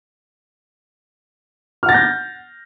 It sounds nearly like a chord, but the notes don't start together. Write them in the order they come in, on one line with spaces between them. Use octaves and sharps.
F6 F#5 A6 A#6 G6